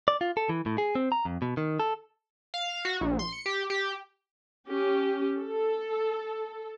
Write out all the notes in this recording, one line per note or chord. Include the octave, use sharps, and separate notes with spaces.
D5
F4
A4
E3
A2
G#4
C4
A#5
F2
B2
D#3
A4
F5
F#4
A#1
C6
C#7
G4
G4
C#4 G4
A4